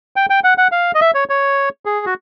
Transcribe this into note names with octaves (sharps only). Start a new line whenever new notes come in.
G5
G5
F#5
F#5
F5
D#5
E5
C#5
C#5
G#4
F#4